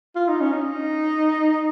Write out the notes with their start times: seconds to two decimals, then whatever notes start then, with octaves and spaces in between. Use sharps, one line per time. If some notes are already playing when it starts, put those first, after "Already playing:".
0.15 F4
0.29 D#4
0.41 C#4
0.53 D#4